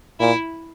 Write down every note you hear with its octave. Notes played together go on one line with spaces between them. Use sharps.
A#2 E4